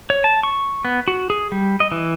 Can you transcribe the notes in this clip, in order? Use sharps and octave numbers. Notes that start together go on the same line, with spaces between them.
C#5
A5
C#6
B3
F#4
G#4
G3
D#5
E3